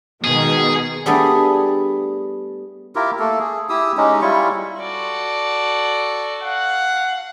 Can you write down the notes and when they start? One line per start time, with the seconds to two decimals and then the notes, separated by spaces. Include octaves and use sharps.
0.24 B2 D#3 G#3 G#4
1.06 G3 A3 B3 D4 G#4 A4
2.95 E4 F4 G4 A#4
3.19 A3 A#3 A4
3.39 G#4
3.69 E4 G4 D#6 E6
3.97 G#3 C#4 D#4 G4
4.21 G3 E4 F4 C#6
4.80 F#4 A4 D5
6.43 F5 F#5